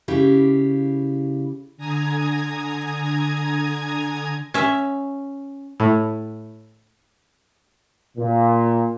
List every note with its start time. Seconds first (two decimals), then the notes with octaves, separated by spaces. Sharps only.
0.08 C#3 E4 G4 F5
1.77 D3 G#5 A#5 D#6 G#6
4.54 C#4 E5
5.80 A2
8.18 A#2